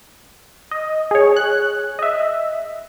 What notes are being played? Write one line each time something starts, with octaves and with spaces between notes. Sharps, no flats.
D#5
G#4 C#5
F#6
D#5 E5